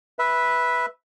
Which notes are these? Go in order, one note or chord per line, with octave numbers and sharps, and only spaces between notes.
B4 E5